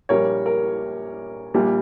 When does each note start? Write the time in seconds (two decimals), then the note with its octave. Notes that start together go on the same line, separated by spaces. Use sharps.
0.09 A#1 A#2 G3 A#4 C#5
0.46 A#4
1.54 A#1 A#2 G3